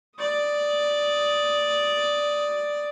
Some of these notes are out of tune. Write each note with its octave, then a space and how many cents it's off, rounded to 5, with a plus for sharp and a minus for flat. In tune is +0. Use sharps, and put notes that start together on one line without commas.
D5 +0 D#6 +0